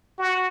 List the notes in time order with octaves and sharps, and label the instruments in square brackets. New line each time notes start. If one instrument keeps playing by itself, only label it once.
[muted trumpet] F#4